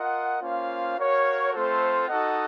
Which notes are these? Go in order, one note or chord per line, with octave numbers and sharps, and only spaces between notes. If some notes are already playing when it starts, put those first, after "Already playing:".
Already playing: F4 A#4 D#5 F#5
A#3 C#4 F4 C5 F5
F#4 A#4 C#5 F5
A3 C4 F4 A4 C5
D#4 F#4 A4 D#5 F#5